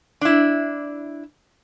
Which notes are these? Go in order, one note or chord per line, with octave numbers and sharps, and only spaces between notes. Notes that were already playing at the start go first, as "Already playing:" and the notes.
D4 E4